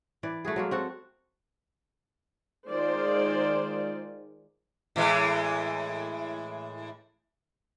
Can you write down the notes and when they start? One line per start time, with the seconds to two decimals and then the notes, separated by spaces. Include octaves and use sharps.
0.23 E3 D5
0.45 A3 F#4 G#4
0.56 F#3 G#3 A#3
0.71 C4 F#4 A4
2.69 D#3 G#3 F4 C5 D5
4.96 A2 E3 G#3